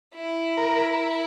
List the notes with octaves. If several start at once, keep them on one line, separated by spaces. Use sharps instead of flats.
E4
A#4